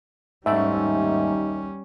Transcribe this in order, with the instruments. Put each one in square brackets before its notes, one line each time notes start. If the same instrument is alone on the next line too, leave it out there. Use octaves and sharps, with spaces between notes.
[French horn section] D#2 D#4 [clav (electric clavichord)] G#2 A3 D5 [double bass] G3 C#4 [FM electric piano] E5